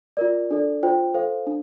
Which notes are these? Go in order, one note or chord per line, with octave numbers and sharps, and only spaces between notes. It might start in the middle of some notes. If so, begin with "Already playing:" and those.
F4 A#4 D5
D4 A4 D5
F4 C5 G5
A4 C5 F5
D4